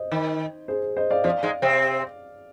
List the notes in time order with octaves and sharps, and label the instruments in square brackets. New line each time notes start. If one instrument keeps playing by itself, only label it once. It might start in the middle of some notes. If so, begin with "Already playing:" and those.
Already playing: [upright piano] C5 D#5
[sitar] D#3
[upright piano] G#4 C5
C5 D#5
D5 F5
[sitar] F3 [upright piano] D5 F5
[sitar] G#2 G#3
C3 C4